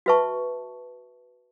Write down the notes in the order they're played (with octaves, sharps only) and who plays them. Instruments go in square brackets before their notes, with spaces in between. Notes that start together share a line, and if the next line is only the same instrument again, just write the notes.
[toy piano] F#4 B4 E5 A5 C#6